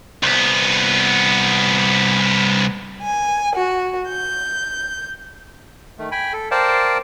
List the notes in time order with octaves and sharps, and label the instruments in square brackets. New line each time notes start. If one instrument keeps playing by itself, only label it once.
[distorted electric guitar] C2 B3
[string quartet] G#5
F#4
G6
[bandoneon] D#3 A3
G5 G#5 B5
A4
A#4 C5 D5 F5 G5 A5